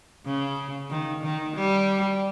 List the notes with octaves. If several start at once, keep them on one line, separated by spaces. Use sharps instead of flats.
C#3
D#3
D#3
G3